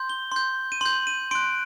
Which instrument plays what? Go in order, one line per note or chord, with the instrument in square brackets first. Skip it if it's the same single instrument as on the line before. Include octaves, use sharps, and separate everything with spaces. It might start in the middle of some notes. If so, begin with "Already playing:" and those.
Already playing: [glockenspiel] C6 G6
G7
C6 G6
D#7
C6 G6 F#7
D#7
C6 F#6 D7